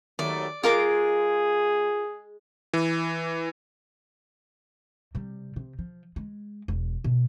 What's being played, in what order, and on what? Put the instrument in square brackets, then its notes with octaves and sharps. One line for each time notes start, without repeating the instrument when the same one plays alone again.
[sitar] D#2 F#3 A3 [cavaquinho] D5
[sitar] G#3 [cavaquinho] F4 A#4 D6 [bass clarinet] G#4
[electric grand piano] E3
[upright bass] C3 G3
C3
F3
G#3
E1
B2